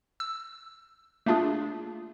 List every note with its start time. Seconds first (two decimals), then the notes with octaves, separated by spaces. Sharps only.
0.20 E6
1.26 A3 A#3 D4 F4 G#4